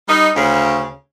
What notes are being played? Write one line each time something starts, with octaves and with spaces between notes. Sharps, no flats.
G3 D#4
D2 C#3